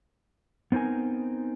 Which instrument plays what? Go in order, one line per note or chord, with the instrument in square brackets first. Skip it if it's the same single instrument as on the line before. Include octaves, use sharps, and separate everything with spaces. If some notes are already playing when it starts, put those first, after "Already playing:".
[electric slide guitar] B3 C4 D#4 A#4 G#5